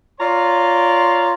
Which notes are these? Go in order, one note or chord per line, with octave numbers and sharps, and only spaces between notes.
F4 C#5 D5 A#5 C6